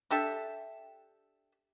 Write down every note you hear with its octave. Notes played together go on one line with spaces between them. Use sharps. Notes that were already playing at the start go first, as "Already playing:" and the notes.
D4 G4 A4 E5